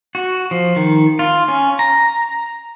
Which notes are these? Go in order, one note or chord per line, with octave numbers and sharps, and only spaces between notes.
F#4
F3
D#3
F4
C#4
A#5